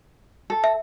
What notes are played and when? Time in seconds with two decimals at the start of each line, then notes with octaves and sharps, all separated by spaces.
0.50 A4
0.64 E5